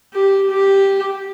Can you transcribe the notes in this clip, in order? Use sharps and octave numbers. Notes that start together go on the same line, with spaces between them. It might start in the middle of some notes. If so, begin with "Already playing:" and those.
G4
G4